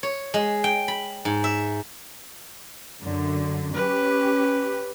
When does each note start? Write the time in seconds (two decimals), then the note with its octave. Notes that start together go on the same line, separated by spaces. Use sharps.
0.03 C#5
0.34 G#3
0.64 G5
0.88 B5
1.25 G#2
1.44 E5
3.01 F#2 D3
3.75 C#4 G4 B4